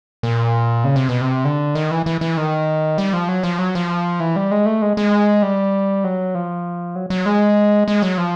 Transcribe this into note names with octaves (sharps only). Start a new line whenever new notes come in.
A#2
C#3
C3
B2
C3
D3
D#3
E3
E3
E3
D#3
G3
F3
F#3
F3
F#3
F3
E3
G3
G#3
A3
G#3
G#3
G3
F#3
F3
F#3
F#3
G#3
G#3
F#3
F3